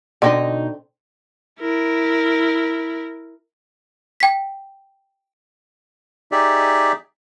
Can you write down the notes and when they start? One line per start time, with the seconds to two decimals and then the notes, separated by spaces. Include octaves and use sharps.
0.22 B2 D3 C4 D#4 D#5
1.60 E4 A#4
4.20 G5 B6
6.32 D#4 G4 G#4 D5 E5